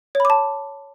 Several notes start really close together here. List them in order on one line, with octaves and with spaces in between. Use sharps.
C#5 B5 D6 A5